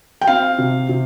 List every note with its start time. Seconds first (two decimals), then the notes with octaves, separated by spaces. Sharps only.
0.21 G5
0.27 C4 F5
0.58 C3
0.89 C3